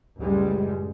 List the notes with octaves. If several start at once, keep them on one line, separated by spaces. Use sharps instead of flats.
C#2 F#2 A2 G3 G#3